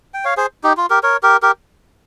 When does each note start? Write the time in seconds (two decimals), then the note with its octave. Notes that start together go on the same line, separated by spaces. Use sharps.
0.14 G5
0.25 C#5 F5
0.37 G#4 C5
0.64 D#4 G4
0.77 F4
0.90 G4 A#4
1.03 A#4 C#5
1.23 G4 A#4
1.42 G4 A#4